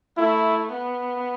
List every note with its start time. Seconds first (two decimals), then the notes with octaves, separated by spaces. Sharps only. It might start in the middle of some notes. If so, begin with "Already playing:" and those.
0.17 A3 E4
0.73 B3